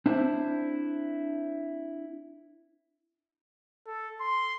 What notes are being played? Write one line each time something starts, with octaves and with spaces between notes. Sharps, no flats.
C4 D4 E4 C5
A4
C6